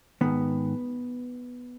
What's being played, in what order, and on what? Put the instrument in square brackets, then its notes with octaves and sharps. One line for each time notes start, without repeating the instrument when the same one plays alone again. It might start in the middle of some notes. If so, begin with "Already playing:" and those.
[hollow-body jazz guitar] G#2 D#3 B3